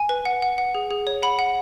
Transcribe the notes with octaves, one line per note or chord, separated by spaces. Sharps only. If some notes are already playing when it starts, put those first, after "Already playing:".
Already playing: G#5
B4
F#5
F#5
F#5
G#4
G#4
C#5
F#5 B5
F#5